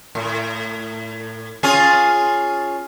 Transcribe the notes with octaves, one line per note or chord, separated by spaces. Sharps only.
A2
C#4 F4 G#4